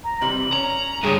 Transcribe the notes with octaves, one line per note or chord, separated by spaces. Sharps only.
A#5
C3 E3 G3 F#7
C#4 A#5
G2 D3 A3 G#4 C#5